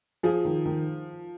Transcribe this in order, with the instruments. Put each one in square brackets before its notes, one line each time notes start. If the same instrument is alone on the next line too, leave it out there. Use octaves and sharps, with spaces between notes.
[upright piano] F3 [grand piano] G#4
[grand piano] D#3
D#3